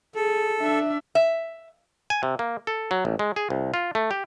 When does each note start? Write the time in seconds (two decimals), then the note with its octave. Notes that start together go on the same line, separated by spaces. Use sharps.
0.15 G#4 A4
0.61 D4 E5
1.15 E5
2.10 G#5
2.23 C3
2.39 A#3
2.67 A4
2.91 F#3
3.05 A1
3.19 G#3
3.36 G#4
3.50 C2
3.74 F4
3.95 A3
4.11 G4